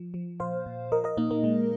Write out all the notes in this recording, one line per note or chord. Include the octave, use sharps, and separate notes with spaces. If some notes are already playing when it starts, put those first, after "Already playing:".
Already playing: F3
F3
A#2 C5 F5
A#2
F3 A#4 D#5
A#4 D#5
A#2 A#3 D#4
A#3
A#2 G#3